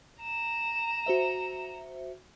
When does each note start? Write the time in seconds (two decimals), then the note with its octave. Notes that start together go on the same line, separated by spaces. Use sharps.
0.22 A#5 E7
1.06 F#4 C5 E5